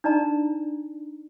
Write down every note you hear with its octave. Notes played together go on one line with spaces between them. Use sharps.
D4 D#4 D5 A#5